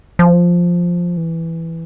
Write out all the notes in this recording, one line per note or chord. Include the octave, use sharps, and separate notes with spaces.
F3
E3